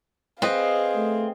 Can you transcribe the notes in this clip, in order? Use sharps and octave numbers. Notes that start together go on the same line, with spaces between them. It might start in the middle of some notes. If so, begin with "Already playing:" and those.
C4 G#4 B4 D#5 F5
A3